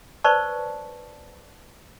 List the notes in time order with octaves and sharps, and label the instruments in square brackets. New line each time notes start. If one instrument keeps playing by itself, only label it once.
[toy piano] B4 C5 D5 A5 C#6